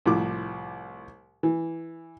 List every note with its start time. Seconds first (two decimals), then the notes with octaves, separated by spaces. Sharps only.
0.06 C2 A2 F3 D6
1.43 E3